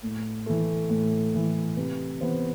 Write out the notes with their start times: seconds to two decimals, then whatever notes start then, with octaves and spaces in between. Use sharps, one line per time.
0.03 A2
0.46 E3 A3
0.90 A2
1.34 E3 A3
1.77 C3 B4
2.20 E3 B3 C5